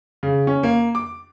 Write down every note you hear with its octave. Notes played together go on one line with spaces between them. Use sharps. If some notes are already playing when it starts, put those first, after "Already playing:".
C#3
C#4
A#3
D6